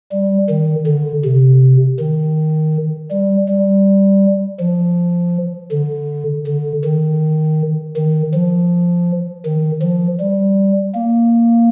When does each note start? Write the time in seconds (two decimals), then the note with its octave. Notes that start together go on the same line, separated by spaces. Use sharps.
0.12 G3
0.49 D#3
0.86 D3
1.25 C3
1.99 D#3
3.11 G3
3.48 G3
4.60 F3
5.71 D3
6.46 D3
6.84 D#3
7.96 D#3
8.34 F3
9.45 D#3
9.82 F3
10.20 G3
10.95 A#3